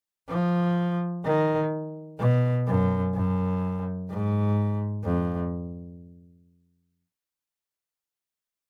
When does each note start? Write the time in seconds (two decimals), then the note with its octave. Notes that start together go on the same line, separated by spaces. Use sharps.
0.29 F3
1.25 D#3
2.19 B2
2.67 F#2
3.14 F#2
4.10 G#2
5.04 F2